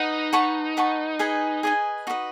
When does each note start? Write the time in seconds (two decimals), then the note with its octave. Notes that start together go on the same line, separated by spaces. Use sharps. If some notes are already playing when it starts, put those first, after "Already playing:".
Already playing: D#4 B4 F#5 B5
0.33 B4 F#5 A5 C#6
0.77 B4 F#5 A5 C#6
1.19 G#4 B4 D#5 G#5
1.63 G#4 B4 D#5 G#5
2.07 D#4 F#4 B4 D#5